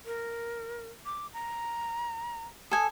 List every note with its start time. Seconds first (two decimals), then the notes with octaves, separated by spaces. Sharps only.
0.05 A#4
1.06 D6
1.34 A#5
2.71 A4 G#5 D#6